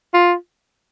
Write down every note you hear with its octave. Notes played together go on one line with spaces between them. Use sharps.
F4